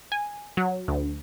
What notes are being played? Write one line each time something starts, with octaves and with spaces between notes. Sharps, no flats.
G#5
F#3
D2